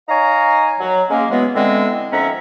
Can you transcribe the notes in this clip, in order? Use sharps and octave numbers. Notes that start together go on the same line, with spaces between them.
D#4 C#5 F5 G#5 A#5
F#3
G#3 A#3 C#4
E3 F#3 G#3 B3
D3 E3 G#3 B3 C4
F2 D#3 C#4 E5 F#5 A#5